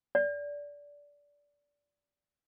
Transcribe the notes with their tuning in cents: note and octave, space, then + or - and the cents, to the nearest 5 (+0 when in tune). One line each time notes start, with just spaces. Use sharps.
D5 -20